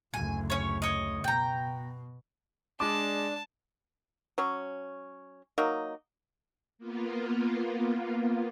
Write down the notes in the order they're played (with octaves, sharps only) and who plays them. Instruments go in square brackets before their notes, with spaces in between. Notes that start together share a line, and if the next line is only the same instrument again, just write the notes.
[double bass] F#1 D2 [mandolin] G#5
[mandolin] C#4 C#5
C#5 D#5
[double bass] B2 [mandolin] G5 A#5
[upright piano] G#3 D6 [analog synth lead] D4 [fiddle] A5
[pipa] F#3 C#4
F#3 A#3 D#4
[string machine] A#3 B3 F4